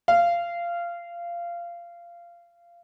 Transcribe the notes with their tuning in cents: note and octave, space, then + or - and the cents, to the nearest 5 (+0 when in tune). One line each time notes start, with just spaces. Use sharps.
F5 -20